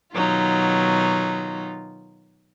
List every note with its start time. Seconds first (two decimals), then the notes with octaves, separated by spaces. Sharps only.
0.14 B2 D#3 F#3 D#4 F4